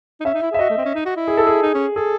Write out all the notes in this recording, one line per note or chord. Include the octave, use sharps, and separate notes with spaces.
D#4
C#4 E5
D#4
E4
G#4 E5
F#4 D#5
A3
C4
C#4
D#4
F#4
E4
G#4
A4
G#4
D#4
C#4
G#4 A4